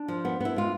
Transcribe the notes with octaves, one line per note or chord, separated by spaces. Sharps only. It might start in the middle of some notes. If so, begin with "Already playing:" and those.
Already playing: D4
F3
B3
B3 E4
G#3 F4